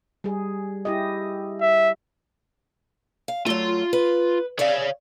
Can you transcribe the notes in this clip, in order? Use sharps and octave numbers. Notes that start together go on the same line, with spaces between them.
G3 G#4
E4 G4 D#5
E5
F5
F#3 A3 F4 C6
B4
C#5 D5 E5 F5